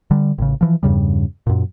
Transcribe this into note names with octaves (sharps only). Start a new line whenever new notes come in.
D3 G3
A1 C#3
E3 F3
E2 G2 C#3 G3
F#2 A#2